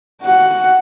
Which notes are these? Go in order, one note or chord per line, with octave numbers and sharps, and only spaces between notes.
F#4 F#5